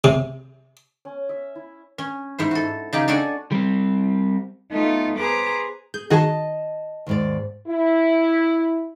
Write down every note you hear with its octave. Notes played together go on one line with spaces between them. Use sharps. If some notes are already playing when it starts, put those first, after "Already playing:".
C3
C#4
E5
E4
C#4
G#2 E4 C5
F#4 A4
C#3 D#4 G4
D4 F#4 A4 D5 G#5
G3 C4
A3 B3 D#4 F4
G#4 B4 C5 A#5 D6
G#4 G6
D#3 F#4 G#4 D#5 F5 A5
D#2 G#2 D5
E4